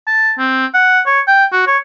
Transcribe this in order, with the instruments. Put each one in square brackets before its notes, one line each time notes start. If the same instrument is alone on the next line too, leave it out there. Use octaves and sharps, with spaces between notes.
[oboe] A5
C4
F#5
C#5
G5
F#4
C#5